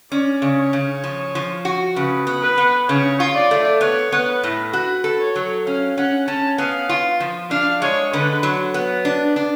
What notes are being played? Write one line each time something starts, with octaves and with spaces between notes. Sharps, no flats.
C#4 D5
C#3
C#5
C#3
F3
F3
F#4
C#3 B4
B3
B4
B3
C#3 C#5
F4
D5
A3
B3 C#5
B3
B4
A2
F#4 B4
A4
C#5
F#3
C#4 F5
C#4 F#5
C#4 A5
B3 F5
F4
F3
D4 F5
G#3 C#5
D3 B4
F#3
B3
D4
D4